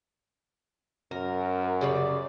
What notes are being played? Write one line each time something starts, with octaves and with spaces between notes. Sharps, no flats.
F#2 A#4
C#3 G3 D5